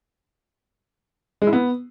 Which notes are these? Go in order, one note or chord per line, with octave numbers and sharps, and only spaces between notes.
G#3
E4
B3